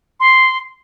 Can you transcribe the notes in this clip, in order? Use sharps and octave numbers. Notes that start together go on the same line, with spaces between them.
C6